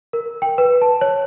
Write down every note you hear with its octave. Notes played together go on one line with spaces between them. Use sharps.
A#4
G5
B4
A5
C#5